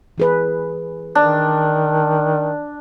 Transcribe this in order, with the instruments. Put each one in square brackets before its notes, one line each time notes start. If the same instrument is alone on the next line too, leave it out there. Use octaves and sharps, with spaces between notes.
[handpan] E3 G#4 B4
[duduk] D#3 [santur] D4